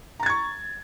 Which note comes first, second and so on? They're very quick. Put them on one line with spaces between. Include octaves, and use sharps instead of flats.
A#5 A6 G#6 C#6